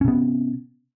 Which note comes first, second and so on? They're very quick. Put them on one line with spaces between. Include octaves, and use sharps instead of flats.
C#4 C3 B3